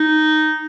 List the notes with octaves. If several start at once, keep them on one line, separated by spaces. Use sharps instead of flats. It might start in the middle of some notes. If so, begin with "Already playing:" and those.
Already playing: D#4